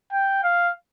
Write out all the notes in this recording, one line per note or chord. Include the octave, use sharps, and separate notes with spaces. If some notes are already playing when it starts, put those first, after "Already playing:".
G5
F5